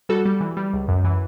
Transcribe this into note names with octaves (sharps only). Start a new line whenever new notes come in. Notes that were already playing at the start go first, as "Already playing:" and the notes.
G3 F#4 A4
G3
E3
G3
C#2
F#2
E3